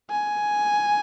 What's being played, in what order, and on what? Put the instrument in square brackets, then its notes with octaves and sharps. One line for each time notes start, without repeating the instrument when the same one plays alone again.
[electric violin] G#5